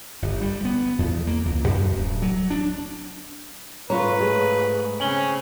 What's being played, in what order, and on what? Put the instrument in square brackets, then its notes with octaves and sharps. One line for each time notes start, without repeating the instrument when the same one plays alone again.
[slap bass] G1
G3
B3
E2
A#3
C#2
F#2
D1
F#3
D4
[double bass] G#2 A3 [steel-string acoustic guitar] F4 C#5 [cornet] B4 [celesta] F5 A#5
[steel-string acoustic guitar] G#4
[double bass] C#3 C4 [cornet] C#4 [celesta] G#5 F#7 G7